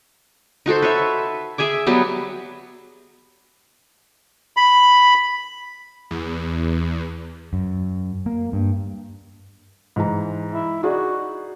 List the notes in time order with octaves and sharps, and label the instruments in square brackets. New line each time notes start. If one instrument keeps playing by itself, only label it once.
[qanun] D#4 F#4 A4 C5
B4 C#5 E5
G#4 E5 G#5 D6
F#3 G3 B3 G4
[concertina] B5
[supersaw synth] E2
[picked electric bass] F#2
A#3
G2
[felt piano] G#2 E3 A#5
[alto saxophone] E4
[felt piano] D#4 G#4 D5 [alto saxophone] F#4